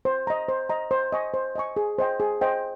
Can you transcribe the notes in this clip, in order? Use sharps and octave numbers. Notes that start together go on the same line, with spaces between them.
C5
D#5 A#5
C5
D#5 A#5
C5
D#5 G#5 C#6
C5
D#5 G#5 C#6
G#4
C5 D#5 G5
G#4
C5 D#5 G5